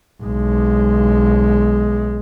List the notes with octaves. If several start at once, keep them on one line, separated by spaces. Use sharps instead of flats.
B1 G#3